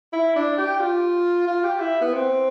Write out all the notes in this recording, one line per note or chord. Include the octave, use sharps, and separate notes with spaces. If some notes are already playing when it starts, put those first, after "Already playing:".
E4
D4
G4
F4
F4
G4
E4
B3
C4